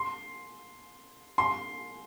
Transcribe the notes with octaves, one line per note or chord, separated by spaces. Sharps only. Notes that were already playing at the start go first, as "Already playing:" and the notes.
Already playing: C6
C6